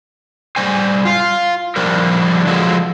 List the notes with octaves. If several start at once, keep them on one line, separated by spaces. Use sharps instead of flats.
G3 C5 G#5
F4 F5
F3 G3 D4 A#4
F3 F#3 G#3 A4 B4